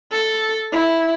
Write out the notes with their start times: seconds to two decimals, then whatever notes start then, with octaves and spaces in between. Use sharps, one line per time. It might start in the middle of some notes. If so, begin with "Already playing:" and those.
0.12 A4
0.72 E4